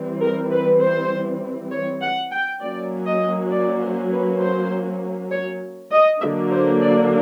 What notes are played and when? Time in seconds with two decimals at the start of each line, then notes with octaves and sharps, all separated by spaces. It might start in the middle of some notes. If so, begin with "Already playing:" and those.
Already playing: E3 G3 C4
0.21 A#4
0.51 B4
0.81 C5
1.71 C#5
2.02 F#5
2.32 G5
2.61 F#3 A#3 C#4 D5
3.07 D#5
3.51 D5
3.82 C5
4.12 B4
4.42 C5
5.32 C#5
5.92 D#5
6.21 D3 F#3 A#3 D4 E5
6.52 C5
6.82 D5